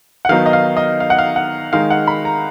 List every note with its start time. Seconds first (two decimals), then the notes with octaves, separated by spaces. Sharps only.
0.25 F#5
0.29 D#3 F#3 B3 D#4 F5
0.46 D#5
0.53 F5
0.77 D#5
1.00 F5
1.10 F#5
1.19 F5
1.36 F#5
1.73 D#3 G#3 D#4 F5
1.90 F#5
2.07 B5
2.25 A#5